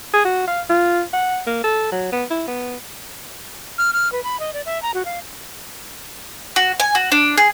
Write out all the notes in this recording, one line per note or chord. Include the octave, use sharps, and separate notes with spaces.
G#4
F#4
F5
F4
F#5
A#3
A4
F#3
B3
E4
B3
F6
F6
B4
B5
D#5
D5
E5
A#5
F#4
F5
F#4
G#5
F#4
D4
G#4